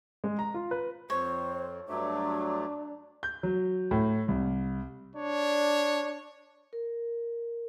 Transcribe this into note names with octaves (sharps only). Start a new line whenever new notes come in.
G#3
A#5
F4
B4
F2 C5 C#5
G2 F#3 A3 D4 D6
G6
F#3
A2
C2
D4 C#5
A#4